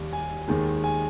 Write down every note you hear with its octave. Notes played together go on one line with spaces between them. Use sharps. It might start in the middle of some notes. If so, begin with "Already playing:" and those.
Already playing: D#2 D#3 G3
G#5
D#2 D#3 G#3
G#5